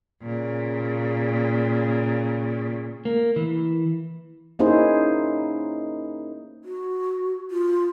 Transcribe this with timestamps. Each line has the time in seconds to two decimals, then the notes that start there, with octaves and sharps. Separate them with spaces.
0.22 A#2 C#3
3.05 A#3
3.36 E3
4.59 A#3 C#4 D#4 E4 G#4 C5
6.64 F#4
7.51 F4